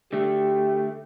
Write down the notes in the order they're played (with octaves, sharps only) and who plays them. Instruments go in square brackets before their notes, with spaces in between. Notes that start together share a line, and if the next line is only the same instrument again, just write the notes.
[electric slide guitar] D3 A3 [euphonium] G4